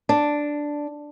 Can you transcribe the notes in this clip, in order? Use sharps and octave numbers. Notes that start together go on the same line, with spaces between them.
D4